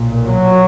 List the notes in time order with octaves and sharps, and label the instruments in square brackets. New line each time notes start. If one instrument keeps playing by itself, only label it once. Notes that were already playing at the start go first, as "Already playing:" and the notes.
Already playing: [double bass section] B1 A#2
F#3